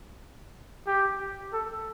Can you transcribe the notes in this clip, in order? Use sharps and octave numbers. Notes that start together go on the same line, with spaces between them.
G4
A4